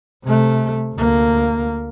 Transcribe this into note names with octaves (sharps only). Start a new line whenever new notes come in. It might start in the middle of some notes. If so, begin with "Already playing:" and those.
C3 A3
D2 A#3